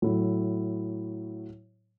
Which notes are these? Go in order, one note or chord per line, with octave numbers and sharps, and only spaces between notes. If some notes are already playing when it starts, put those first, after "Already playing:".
A2 F#3 A3 E4